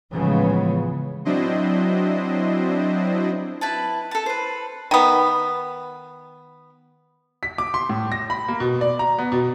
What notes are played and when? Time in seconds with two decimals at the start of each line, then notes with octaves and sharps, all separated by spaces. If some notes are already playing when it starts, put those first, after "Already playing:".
0.12 A2 C#3 E3 F3 G#3 B3
1.25 F#3 C4 D4 E4 C5 D#5
3.61 E4 B4 A5
4.11 A4 A5
4.26 B4 C5
4.91 D#3 B3
7.43 B6
7.58 D6
7.74 C6
7.89 A2
8.12 A#6
8.30 B5
8.48 A#3
8.60 B2
8.81 D5
8.99 A#5
9.19 B3
9.32 B2